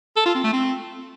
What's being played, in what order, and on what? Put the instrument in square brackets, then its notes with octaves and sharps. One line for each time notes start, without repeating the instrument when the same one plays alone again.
[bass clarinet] A4
F4
C4
A3
C4